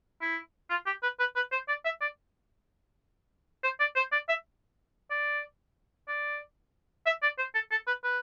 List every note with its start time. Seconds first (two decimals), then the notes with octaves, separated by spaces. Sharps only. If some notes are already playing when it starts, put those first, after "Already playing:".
0.22 E4
0.70 F4
0.87 G4
1.03 B4
1.20 B4
1.36 B4
1.52 C5
1.69 D5
1.85 E5
2.01 D5
3.64 C5
3.80 D5
3.96 C5
4.12 D5
4.29 E5
5.11 D5
6.08 D5
7.06 E5
7.23 D5
7.38 C5
7.55 A4
7.71 A4
7.87 B4
8.04 B4